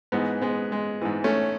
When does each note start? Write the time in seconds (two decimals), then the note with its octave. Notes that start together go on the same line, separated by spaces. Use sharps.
0.12 G#2 E3 G#3 B3
0.41 G#3 B3
0.72 G#3
1.01 G#2 E3
1.24 A3 C#4